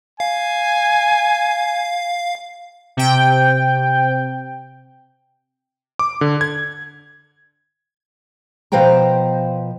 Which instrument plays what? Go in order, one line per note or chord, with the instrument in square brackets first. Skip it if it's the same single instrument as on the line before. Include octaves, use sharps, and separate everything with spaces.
[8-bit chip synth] F5 [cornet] G#5
[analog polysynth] C3 G5
[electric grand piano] D6
D3
G#6
[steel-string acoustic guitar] B2 F3 B4 C5 G5 A#5